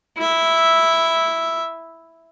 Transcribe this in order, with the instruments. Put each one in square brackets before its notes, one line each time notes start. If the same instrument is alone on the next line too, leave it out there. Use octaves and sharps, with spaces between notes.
[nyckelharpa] E4 E5